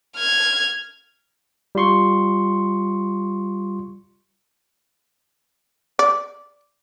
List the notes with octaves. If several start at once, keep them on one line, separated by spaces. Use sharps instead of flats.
F6 G#6
G3 F4 C6 C#6
D5